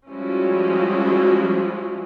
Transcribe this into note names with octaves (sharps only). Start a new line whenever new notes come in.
F3 G3 G#3 C#4 E4 F#4